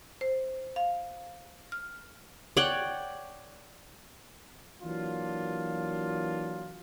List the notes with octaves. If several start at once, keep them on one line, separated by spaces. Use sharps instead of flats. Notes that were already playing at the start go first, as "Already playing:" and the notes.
C5
F5
F6
C#5 D5 F#5 G5
E3 F#3 A#3 D4 F4